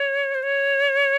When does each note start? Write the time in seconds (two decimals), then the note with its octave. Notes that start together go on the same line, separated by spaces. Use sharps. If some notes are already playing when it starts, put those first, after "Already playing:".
Already playing: C#5
0.34 C5
0.43 C#5